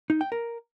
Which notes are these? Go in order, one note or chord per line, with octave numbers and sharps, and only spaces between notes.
D#4
G5
A#4